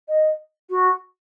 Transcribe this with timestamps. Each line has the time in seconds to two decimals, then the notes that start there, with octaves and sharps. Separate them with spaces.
0.08 D#5
0.70 F#4